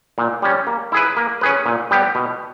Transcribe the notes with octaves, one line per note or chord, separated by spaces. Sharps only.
A#2
G3 C#4
A#3
E4 G#4 B4
A#3
C#4 G#4 B4
A#2
G3 B3 G4
B2